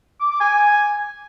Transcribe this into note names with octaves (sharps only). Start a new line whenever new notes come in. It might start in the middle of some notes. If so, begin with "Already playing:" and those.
D6
D6
G#5